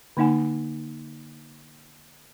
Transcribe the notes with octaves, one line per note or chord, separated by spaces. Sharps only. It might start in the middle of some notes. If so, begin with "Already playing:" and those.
D3 A#3 D#4 F#5 G#5